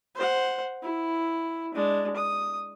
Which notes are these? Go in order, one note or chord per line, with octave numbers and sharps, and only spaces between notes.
C5 F#5
E4
G#3 D4
D#6